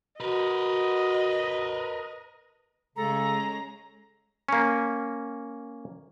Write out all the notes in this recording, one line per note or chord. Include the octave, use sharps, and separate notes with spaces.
F#4 A#4 B4 D#5
C#3 G#3 C#4 A4 A#5
A#3 C#4